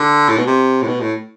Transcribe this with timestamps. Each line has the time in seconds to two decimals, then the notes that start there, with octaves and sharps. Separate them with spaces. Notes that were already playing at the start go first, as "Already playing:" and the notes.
Already playing: D3
0.29 A2
0.38 B2
0.47 C3
0.82 A2
0.88 B2
1.01 A2